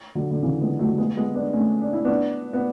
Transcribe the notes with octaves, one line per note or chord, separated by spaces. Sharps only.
D3 F#3
D3
C#3 E3
G#3 B3
F#3 A3
A3
G#3 B3
G#3 B3
B3 D4
A3 C#4
D4
E4
B3 D4
B3